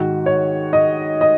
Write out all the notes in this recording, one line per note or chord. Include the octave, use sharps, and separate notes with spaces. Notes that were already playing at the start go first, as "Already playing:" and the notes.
Already playing: G#2 D#3 F#4
C#5
D#5
D#5